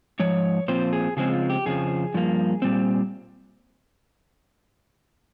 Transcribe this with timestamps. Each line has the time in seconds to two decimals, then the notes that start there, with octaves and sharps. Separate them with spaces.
0.19 G#2 F3 C#5
0.68 A#2 F3 C4 C5
0.93 G#4
1.17 C#3 F3 G#3 C4 G#4
1.33 F4
1.50 G4
1.66 F2 C#3 F3 G#4
2.14 G2 F3 A#3
2.62 A#2 G3 C4